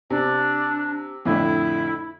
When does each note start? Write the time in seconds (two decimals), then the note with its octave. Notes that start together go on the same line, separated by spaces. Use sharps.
0.10 C3 D4
1.25 F2 A2 D3 E4